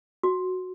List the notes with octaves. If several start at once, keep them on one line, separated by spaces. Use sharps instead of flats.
F#4